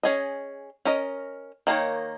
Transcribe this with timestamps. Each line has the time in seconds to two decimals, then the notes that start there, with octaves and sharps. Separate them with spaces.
0.03 C#4 G#4 D#5
0.85 C#4 A#4 D#5
1.67 D#3 A#3 D#4 C#5